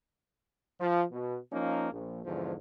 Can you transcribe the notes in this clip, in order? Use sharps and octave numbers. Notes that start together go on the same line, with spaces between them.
F3
B2
F3 A#3 C#4 D#4
A#1
E2 G#2 D3 F3